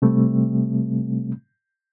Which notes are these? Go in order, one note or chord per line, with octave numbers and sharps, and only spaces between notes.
C3 G3 A3 C4